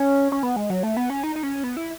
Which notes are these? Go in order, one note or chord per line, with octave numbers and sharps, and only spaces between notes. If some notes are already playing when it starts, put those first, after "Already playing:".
Already playing: C#4
C#4
B3
G#3
F#3
A3
B3
C#4
D#4
D#4
C#4
B3
E4